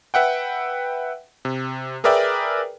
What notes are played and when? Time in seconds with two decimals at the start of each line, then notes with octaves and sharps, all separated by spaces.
0.14 B4 E5 F#5 G5
1.45 C3
2.04 G#4 A#4 B4 D5 E5 G5